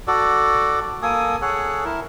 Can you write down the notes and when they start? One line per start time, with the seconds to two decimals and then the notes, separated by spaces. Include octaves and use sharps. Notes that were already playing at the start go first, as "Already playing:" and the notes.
0.08 F#4 A4 D5
1.02 A#3 A4 G#5 D#6
1.42 G#4 A4 C#5 F#5
1.85 E4 A#4